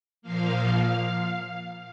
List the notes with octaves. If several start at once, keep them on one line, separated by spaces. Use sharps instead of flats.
A#2 F3 A#3 F5